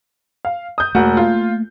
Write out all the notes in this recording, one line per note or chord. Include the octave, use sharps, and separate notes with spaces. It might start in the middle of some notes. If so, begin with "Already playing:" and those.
F5
D#6 G6
E1 A3 A#3 F#4
F4